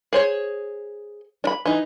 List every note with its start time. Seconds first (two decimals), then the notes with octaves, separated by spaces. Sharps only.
0.13 G#4 C5 C#5
1.44 D4 B5
1.66 E3 D#4